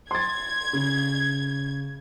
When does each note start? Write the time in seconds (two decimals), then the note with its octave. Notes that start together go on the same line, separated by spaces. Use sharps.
0.11 C6 G#6 A6
0.73 C#3